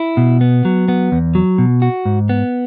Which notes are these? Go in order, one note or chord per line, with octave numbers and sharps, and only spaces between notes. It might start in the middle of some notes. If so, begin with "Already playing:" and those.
Already playing: E4
B2
B3
F#3
B3
E2
F#3
B2
F#4
G#2
B3